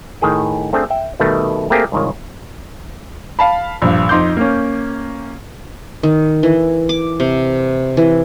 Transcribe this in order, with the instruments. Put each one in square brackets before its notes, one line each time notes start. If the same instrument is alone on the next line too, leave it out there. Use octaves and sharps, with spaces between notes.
[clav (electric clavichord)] A2 D#3 G#4 G5
A3 C4 D4 G#4
E5 G5
B2 D#3 G3 A3
A3 A#3 C4 G4 G#4 A#4
C2 G#2 D#3 F4 C#5
[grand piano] F5 A5 B5
A#1 G2
F2 D#4 C6 D6 G6
A#3 C#4
[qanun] D#3
E3
D6
C3
E3